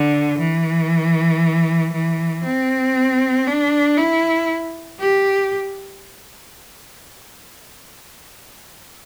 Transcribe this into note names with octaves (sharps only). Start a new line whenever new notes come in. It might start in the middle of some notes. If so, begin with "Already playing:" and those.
Already playing: D3
E3
E3
C4
D4
E4
G4